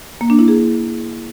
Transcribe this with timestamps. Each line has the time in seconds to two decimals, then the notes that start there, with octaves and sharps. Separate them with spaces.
0.21 A#3
0.30 D4
0.39 E4
0.48 G#4